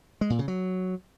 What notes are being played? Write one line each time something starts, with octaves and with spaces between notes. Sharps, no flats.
G#3
A#2
C#3
F#3